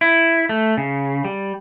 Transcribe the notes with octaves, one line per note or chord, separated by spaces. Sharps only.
E4
A3
C#3
G3